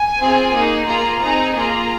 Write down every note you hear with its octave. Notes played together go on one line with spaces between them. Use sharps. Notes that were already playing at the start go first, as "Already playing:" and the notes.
Already playing: G#5
C4 F4 G#4
A#3 D#4 G#4
A#3 F4 G#4 A#5
C4 D#4 G#4 A#5
A#3 F4 G#4 A#5